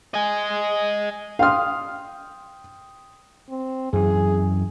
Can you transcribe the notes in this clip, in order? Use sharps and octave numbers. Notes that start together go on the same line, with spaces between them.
D#5 G#5
F5 G5 C6 D#6 F6
C4
F#2 E3 G#4